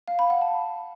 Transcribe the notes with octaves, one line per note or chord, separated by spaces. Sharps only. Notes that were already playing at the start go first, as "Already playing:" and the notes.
F5
B5
F#5
A5